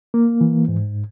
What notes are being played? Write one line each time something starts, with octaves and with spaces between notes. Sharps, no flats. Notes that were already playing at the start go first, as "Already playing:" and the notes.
A#3
E3
G#2